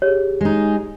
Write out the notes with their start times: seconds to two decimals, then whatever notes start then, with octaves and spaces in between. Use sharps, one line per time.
0.02 G4 G#4 C#5
0.41 G#3 D#4